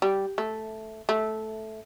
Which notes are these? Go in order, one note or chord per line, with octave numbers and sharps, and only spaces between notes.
G3
A3
A3